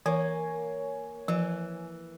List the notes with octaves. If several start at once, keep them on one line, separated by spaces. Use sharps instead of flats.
E3 A#3 C#5 G#5
E3 F3